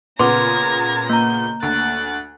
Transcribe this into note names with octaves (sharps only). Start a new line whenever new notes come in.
A#2 C#3 B3 A#5 C6 D6 G#6
A#3 A#5 G6
D2 F#6 A6